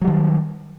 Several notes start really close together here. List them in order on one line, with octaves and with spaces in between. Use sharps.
F#3 G3 D#3